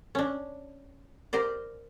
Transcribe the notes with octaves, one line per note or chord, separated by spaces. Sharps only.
C#4 D4
G4 A#4 C5 D5